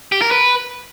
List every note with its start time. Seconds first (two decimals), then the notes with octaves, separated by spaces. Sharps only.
0.12 G4
0.22 A#4
0.31 B4